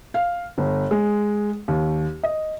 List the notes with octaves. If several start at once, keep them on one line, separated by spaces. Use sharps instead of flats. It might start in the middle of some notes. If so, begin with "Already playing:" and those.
F5
G1
G#3
D#2
D#5